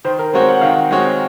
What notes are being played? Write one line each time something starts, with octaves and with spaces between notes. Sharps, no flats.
D#3 C5
A#4
G#3 C4 F#4 C5 C#5
F#5
D#3 F5
F#5
G#3 C4 F#4 C#5